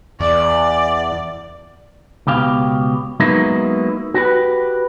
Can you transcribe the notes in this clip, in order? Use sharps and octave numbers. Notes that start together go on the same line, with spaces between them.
E2 D5
C#2 B2 G4 F5
F#3 G#3 A#3 B3 D#4 E4
F#4 G4 B4